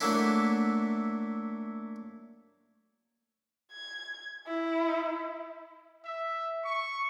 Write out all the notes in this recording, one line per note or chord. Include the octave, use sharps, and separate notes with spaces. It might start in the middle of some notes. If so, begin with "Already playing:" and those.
F#3 A3 A#3 D4 E4
G#6
E4
E5
C#6